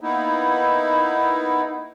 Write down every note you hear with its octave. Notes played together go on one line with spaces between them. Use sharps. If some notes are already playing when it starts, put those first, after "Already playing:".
A#3 B3 D#4 E4